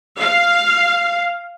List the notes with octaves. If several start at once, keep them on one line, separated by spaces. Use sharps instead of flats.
F5